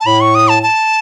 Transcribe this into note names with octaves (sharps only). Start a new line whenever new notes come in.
A5
A2 B5
C#6
D#6
A5
A5